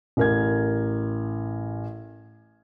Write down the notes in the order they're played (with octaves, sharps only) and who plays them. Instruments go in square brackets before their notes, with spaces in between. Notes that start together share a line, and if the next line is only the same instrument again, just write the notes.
[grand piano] A1 A#4 G#6